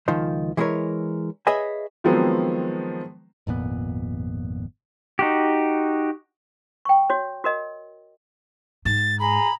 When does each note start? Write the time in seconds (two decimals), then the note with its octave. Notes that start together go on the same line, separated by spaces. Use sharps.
0.08 C#2 D#3 F3 C5
0.57 E3 G#3 B3 E4 A#4 C#5
1.47 G#4 B4 C#5 D#5 E5 G#5
2.04 D#3 F3 F#3 G#3 B3 C4
3.47 G#1 F2 A#2 B3
5.19 D#4 F#4 G4
6.85 G5 C#6
7.10 F#4 C#5
7.44 F#4 A#4 D#5
8.85 G#2 A6
9.20 G#4 A#5 B5